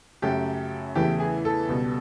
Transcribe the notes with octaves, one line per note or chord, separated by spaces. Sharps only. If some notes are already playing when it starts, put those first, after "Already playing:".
F#2 C#3 F#3 A3 G4
E2 C#3 E3 A3 G4
G#4
A4
C#2 B2 G3